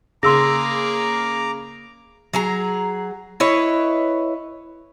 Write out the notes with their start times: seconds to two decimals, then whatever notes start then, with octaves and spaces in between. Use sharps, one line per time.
0.23 C#3 A#3 G#4 A#5 C6 D6 E6 A#6
2.33 F#3 G#4 A#5
3.40 E4 B4 C#5 D#5